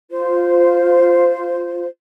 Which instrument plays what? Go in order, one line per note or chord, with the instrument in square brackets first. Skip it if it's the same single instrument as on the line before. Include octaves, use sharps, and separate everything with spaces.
[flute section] F4 C5